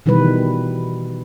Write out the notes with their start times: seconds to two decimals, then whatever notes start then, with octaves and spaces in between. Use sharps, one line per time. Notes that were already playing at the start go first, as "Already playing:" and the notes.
0.06 B2 D#3 E3 G3 B4